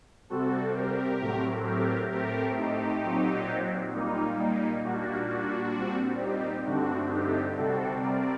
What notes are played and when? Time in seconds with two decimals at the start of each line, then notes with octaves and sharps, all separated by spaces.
0.30 C3 G3 C4 F#4 A4
0.75 G4 A#4
1.21 A2 F#3 A3 C4
1.66 G4 A#4
2.12 A2 A3 C4 G4 A#4
2.57 D#4 G4
3.03 A#2 F#3 C4
3.94 A#2 G3 A#3 D#4
4.39 D#4
4.84 A#2 G3 A#3 D4 F#4
5.29 D4 F#4
5.75 A#2 G3 C4
6.21 D#4 G4
6.66 G2 D3 A3 C4 D4 F#4
7.12 D#4 G4
7.57 C3 G3 C4 F#4 A4
8.02 A#4 D5